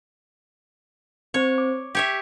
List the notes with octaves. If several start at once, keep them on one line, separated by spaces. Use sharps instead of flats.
C4 C5 C#5
D6
G4 C#5 E5